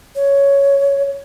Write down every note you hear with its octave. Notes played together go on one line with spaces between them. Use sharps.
C#5